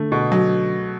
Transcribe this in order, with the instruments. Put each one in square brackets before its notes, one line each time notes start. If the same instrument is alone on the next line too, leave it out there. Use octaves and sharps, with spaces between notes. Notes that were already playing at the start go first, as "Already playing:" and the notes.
Already playing: [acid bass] D3 [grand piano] A3
[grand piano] B2
F#3